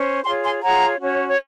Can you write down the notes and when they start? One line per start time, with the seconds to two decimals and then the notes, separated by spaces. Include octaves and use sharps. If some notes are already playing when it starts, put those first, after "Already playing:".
Already playing: C#4 C5
0.25 F4 G#4 C#5 G#5 C6
0.43 G#5 C6
0.62 F4 G#4 C#5 F#5 A#5
1.00 C#4 F#4 C#5
1.28 C#5